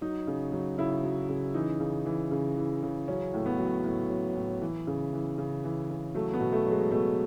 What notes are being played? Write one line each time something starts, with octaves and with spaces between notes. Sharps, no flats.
F#3 D#4
C#3
F#3
C#3 E4
F#3
C#3
E3 D#4
C#3
E3
C#3
E3
C#3
F#3 C#4
A2
B3
F#3
A2
F#3
A2
E3
C#3
E3
C#3
E3
C#3
F#3 A3
B3
B2
A3
F#3
G#3
B2 A3